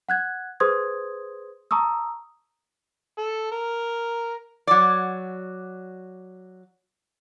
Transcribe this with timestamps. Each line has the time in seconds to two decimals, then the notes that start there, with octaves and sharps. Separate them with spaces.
0.09 F#5 F#6 G#6
0.60 G#4 B4 C5 C6 D#6 G#6
1.71 A5 A#5 C#6 D#6 E6
3.18 A4
3.52 A#4
4.67 F#3 D5